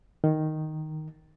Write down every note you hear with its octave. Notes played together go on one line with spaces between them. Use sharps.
D#3